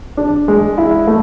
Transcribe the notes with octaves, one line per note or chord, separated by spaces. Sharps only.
D4
G#3
E4
A3